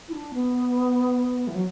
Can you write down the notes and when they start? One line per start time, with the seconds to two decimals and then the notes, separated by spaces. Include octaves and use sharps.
0.08 E4
0.13 D4
0.34 B3
1.48 E3
1.55 F#3